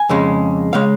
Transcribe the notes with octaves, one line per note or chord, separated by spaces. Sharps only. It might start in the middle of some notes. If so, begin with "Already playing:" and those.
Already playing: G#5
F2 C#3 G#3
C#3 G#3 F5